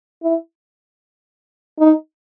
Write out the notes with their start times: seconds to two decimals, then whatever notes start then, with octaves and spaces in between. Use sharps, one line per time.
0.23 E4
1.79 D#4